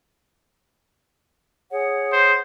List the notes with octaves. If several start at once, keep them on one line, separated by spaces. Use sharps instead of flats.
G#4 C#5 F#5
C5